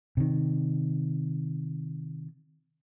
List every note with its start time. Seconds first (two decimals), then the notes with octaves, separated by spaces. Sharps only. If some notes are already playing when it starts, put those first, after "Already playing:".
0.17 C3 D#3